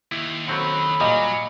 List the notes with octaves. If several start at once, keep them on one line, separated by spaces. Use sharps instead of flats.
D#2 E4
F#3 C4 C#4 A4 F#5 B5
A#2 F#3 G3 D#5